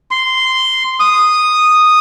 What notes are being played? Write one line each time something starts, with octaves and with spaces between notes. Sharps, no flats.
C6
D#6